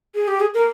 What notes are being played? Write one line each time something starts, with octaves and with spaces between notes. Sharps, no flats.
G#4
G4
G#4
A#4